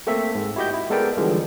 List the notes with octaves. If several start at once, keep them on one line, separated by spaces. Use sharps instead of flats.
A3 A#3 C4 A4 E5
G#2
E4 F#4 G4 D#5 G6
E4
G#3 B3 A4 A#4 D5 G5
D3 E3 F3 G3 G#3